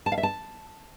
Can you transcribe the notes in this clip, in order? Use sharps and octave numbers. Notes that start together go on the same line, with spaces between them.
A5
F5
E5
A5